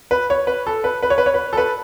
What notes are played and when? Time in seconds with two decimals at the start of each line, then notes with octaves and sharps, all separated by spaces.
0.11 B4
0.30 C#5
0.47 B4
0.67 A4
0.84 B4
1.03 B4
1.10 C#5
1.18 B4
1.26 C#5
1.34 B4
1.53 A4
1.57 B4